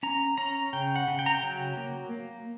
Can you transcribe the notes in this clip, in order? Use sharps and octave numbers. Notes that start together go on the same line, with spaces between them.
C#4 A#5
C#4 A#5
C#3 G5
F#5
C#3
G5
A#5
G5
F#3
A#3
A#3